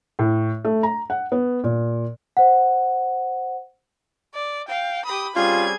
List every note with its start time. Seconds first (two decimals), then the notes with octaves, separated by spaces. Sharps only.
0.19 A2
0.65 A3
0.83 A#5
1.10 F#5
1.32 B3
1.64 A#2
2.37 C5 F#5
4.35 D5
4.68 F5 G5
5.06 G4 B5 D#6
5.36 G3 C4 C#4 F4 G#4 G#6